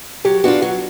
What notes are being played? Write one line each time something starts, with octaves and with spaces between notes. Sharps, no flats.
F#3 G4
B3 D4 F4 F#4
F#3 F#4